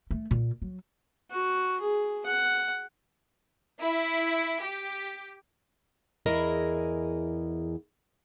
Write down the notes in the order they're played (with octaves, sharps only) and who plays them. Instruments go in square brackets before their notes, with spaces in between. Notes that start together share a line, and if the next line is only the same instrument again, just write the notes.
[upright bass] A3
A#2
F#3
[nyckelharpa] F#4
G#4
F#5
[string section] E4
G4
[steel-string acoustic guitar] E2 E4 G#4 A#4 D#5